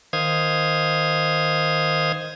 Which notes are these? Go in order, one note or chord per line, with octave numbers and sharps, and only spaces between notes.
D#3 C5 F5 D#6 G#6